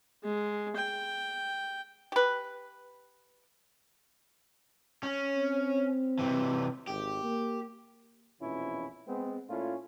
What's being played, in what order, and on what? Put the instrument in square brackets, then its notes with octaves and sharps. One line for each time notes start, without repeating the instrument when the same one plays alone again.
[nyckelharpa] G#3
G5
[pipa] G4 B4
[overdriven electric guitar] C#4
[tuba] C4
[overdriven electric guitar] C3 E3
[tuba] G#1 [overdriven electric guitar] G4
[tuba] A#3
[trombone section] A#1 F2 B2 E3 C#4 E4
G#3 B3 C4
A#2 A3 C#4 E4 F4